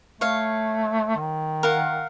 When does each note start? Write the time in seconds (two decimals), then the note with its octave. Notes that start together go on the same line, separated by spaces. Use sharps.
0.21 A3 C#5 F5
1.16 D#3
1.63 A#4 F5 F#5